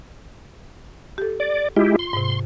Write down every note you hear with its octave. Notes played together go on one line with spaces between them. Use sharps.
G4 A4
D5
G#3 E4 F4 G4
C6
G#2 C3